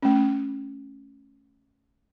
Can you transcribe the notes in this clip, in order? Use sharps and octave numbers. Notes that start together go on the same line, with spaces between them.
A3 C#4